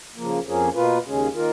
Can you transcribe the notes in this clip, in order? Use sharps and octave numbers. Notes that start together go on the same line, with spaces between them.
C#3 F3 A#3
F2 F3 A#3 C#4 G#4
B2 A#3 F4 B4
D#2 C#3 G#3 C#4 G#4
D#3 A#3 F4 A#4